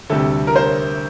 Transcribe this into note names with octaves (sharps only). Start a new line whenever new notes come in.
D2 C3 G3 A4
A#4
C5